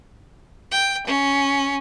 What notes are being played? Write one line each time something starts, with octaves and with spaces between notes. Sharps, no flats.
G5
C#4